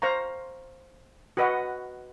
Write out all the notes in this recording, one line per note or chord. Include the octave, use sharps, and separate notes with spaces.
C5 F5 A#5 C#6
F#4 B4 D#5 F#5